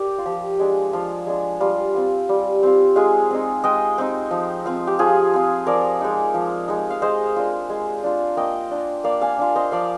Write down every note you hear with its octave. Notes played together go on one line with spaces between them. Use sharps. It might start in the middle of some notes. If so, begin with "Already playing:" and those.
Already playing: G4 A#4 D5
F4
F3 G4
G#3 D4
F3 F4
G#3 D4
G3 F4
C4 F4
G3
C4 F4
G#3 F4 G#4
C4 D#4
G#3 D#5 G5
C4 D#4
F3
C4 F4
G4
F3 F4 G#4
C4 F4
F3 A#4 D5
G#3 D#4
F3
G#3 D#4
F5
G#3 C5 D#5
D4 F4
G#3
D4 F4
A#3 D#5 G5
D4 F4
A#3 D5 F5
F5 G#5
D4 F4
C5 D#5
F3 D5 F5